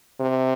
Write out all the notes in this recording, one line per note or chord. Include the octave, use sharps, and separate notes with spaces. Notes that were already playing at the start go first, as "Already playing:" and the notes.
C3